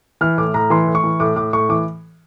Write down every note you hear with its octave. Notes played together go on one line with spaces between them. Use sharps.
E3 F6
A2 D6
A2 A#5
E3 C6
A2
C#6
E3
A2 D6
A2 D6
A2 C#6
E3 D6